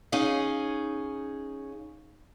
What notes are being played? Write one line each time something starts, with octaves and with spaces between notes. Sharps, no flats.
C#4 D#4 G#4 F5